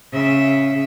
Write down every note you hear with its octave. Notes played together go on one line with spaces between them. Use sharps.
C#3 E5